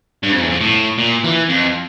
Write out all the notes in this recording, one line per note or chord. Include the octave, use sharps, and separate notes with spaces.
G2
F2
E2
F2
A2
A#2
E3
F2